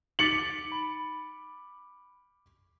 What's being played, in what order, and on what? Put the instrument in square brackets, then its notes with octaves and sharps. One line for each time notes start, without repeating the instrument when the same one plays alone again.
[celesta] D#4 A6 B6 [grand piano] D6 C#7 F#7
[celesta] B5